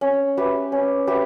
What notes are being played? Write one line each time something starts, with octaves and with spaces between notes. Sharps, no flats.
C#4
G4 B4 E5
C#4
G4 B4 E5